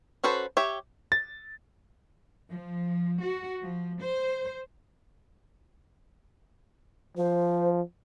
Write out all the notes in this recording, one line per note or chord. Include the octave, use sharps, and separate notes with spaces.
C#4 F#4 A4 B4 C5
G4 C#5 E5
A6
F3
F#4
F3
C5
F3 C5